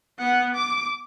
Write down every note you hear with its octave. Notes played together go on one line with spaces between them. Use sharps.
B3 F#5
D6